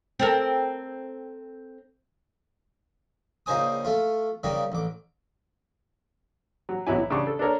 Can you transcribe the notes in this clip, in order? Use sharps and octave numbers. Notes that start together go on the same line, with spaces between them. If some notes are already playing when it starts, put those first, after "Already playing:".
C4 A4 A#4
A#1 C#3 D#4 C5 G#5 D#6
A3 F4
C#3 G3 A#3 D#4
A1 D6
F#3
B1 F#3 C#4 E4 G#5
E4
C#3 D4 G4 C#6
A4
D4 A4 A#4 C#5